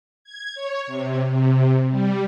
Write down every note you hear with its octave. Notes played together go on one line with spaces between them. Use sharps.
G#6
C#5
C3
C3
G3